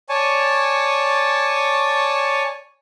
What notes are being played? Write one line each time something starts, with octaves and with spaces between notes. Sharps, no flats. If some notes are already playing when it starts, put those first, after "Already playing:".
C#5 D5 G#5 A5 C#6